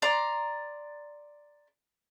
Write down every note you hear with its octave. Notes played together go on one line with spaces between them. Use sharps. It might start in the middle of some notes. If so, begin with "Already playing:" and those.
D5 A#5 C6